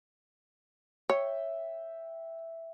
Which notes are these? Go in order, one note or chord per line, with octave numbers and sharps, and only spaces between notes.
C#5 E5 G5